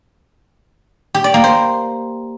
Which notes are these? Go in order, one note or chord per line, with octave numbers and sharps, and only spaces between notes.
G4
D5
A#3
C5